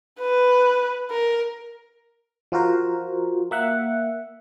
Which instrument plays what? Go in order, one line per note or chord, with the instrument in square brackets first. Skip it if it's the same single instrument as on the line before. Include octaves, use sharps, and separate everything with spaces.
[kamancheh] B4
A#4
[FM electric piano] F3 F4 F#4 A#4 C5
A#3 E5 F#5